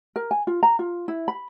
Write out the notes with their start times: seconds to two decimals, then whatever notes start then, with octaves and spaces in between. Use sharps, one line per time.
0.16 A#4
0.31 G#5
0.47 F4
0.63 A#5
0.79 F4
1.08 E4
1.28 B5